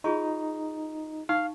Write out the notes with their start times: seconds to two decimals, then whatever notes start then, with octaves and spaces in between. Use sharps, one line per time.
0.04 D#4 F4 G#4 C#6
1.29 D#4 F5 C#6